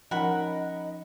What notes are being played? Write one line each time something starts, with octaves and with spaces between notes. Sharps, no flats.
F3 C#4 D#4 A#4 D#5 F#5 B5